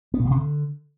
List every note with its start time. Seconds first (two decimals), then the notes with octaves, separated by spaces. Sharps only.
0.14 B3
0.19 B2
0.25 A#2
0.31 C3
0.36 D3